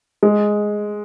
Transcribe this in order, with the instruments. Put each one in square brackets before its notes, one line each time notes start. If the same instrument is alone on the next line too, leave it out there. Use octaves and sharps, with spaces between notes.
[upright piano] G#3